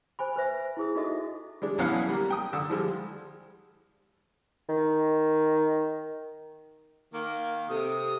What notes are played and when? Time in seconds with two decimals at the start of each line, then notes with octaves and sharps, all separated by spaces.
0.19 C5 G#5 B5
0.36 B4 C5 E5
0.77 E4 G#4 D#6
0.96 D#4 F#4 A4 D#5 E5 D#6
1.62 G3 G#3 D4
1.78 B1 E3 B3 C#4 F5 F#5
2.09 G3 A#3
2.30 G5 D#6
2.53 D3 E6
2.70 F3 G3 G#3
4.69 D#3
7.13 D#3 A#3
7.69 C3 A4 D#6